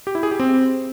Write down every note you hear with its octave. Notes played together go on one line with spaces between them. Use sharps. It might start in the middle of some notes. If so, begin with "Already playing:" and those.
G4
E4
G#4
G4
C4